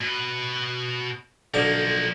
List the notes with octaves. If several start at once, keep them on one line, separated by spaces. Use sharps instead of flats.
B2 B4
B1 D3 F3 A#3 D6